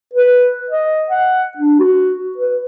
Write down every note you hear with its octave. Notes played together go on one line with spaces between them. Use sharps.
B4
D#5
F#5
D4
F#4
B4